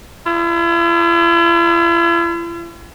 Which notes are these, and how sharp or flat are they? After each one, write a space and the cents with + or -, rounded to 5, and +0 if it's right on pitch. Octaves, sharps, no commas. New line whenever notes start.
E4 +45